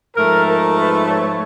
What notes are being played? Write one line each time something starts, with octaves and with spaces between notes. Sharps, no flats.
G#2 F3 A3 A#4
A#4
B4
C#5